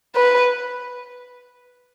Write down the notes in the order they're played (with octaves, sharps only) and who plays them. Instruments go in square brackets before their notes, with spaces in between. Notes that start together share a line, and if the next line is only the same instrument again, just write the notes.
[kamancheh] B4